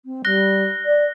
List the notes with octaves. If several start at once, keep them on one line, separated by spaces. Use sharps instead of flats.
C4
G3 F#6 A#6 G7
D5